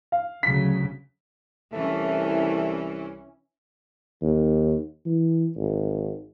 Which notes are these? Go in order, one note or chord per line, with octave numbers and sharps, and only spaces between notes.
F5
D2 C#3 F#3 B6
C2 E3 A3 C#4
D#2
E3
G#1